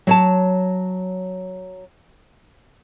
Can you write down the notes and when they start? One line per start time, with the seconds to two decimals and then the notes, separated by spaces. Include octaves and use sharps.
0.07 F#3 C#5 A5